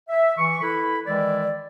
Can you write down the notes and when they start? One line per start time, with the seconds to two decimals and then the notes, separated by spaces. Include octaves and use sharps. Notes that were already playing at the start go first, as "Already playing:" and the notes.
0.09 E5
0.38 E3 C#6
0.61 E4 A4 B4 B5
1.06 D#3 E3 G#3 E4 D5